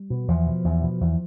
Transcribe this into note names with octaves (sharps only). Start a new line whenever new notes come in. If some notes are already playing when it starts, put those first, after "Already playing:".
Already playing: G3
B2
E2 F3
B2
E2
B2
E2